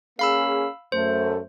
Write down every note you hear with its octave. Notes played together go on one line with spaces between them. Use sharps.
A#3 C#4 G#4 F5 B5 E6
F#2 A3 C5